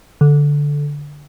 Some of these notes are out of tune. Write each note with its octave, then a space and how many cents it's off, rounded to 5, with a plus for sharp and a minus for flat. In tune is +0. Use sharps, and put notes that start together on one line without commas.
D3 -10